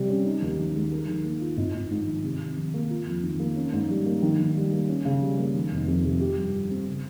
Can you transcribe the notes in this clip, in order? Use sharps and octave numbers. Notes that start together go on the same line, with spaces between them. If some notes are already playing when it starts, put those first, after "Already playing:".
Already playing: C3 G3
C#4
D#4
D#2
D#3
G#3
A#4
D#3
A#3
F4
G#1
G#1
G#2
D#3
C3
C3
D#3
A#3
F4
F2
D#3
A#3
C#4
G#2
G3
A#3
D#3
D#3
G3
A#3
C#4
C#3
G3
A#3
D#3
F1
F2
C3
G4
G2
F3
C4
C#3